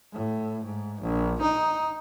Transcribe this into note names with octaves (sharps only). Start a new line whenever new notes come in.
A2
G#2
A#1
D#4